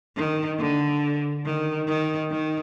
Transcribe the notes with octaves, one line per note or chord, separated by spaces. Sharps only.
D#3
D3
D#3
D#3
D#3